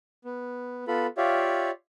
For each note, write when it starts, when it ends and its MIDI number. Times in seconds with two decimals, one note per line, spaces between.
0.25 0.84 59
0.88 1.07 59
0.88 1.07 65
0.88 1.07 69
0.88 1.07 83
1.17 1.70 65
1.17 1.70 67
1.17 1.70 73
1.17 1.70 74
1.17 1.70 76
1.17 1.70 77